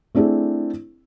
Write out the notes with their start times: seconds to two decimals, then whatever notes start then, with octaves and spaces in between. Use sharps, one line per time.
0.15 A3 C4 D4 E4 G#4